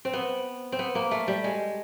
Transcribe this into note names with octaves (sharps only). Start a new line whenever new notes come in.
C4
B3
C4
B3
A#3
A3
G3
G#3